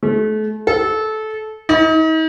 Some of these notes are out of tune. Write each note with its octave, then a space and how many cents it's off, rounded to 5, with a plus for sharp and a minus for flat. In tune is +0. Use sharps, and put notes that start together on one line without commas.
A3 -35
A4 -20
D#4 +40